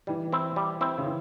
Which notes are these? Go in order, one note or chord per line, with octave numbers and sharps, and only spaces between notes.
E3 G3
C4 E4
G3
C4 E4
C#3
E3